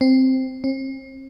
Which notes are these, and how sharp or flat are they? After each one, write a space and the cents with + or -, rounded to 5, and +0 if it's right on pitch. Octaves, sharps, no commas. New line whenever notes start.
C4 +0
C4 +40